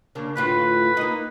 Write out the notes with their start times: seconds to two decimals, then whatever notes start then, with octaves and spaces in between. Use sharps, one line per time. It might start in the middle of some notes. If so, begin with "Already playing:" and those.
0.15 C#3 A#3 D4
0.36 D2 A2 F4 B4
0.97 A#3 D#4